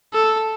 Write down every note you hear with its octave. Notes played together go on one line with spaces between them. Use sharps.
A4